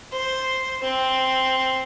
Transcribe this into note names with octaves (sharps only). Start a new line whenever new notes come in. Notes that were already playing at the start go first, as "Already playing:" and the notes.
C5
C4